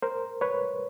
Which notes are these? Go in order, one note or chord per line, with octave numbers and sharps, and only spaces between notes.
A#4 C5
B4 C#5